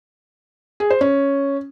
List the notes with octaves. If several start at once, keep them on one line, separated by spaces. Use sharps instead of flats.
G#4
C5
C#4